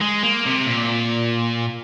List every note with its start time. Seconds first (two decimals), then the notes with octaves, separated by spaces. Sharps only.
0.01 G#3
0.23 A#3
0.46 C3
0.67 A#2